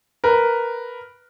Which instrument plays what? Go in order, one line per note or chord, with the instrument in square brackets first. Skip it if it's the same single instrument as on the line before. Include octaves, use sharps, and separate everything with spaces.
[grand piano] A#4 B4